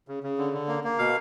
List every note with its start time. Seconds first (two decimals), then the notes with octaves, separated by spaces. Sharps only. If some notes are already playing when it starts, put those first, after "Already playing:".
0.08 C#3
0.23 C#3
0.38 D3
0.53 D3
0.68 A#3
0.84 A#3
0.99 B2 F5